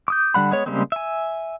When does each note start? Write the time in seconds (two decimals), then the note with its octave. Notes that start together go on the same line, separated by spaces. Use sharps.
0.08 D6 D#6 G6
0.34 D3 G3 F#5 B5
0.51 G#3 B3 C#5
0.66 C#3 G3 G#3 A#3 C4
0.92 E5 G#5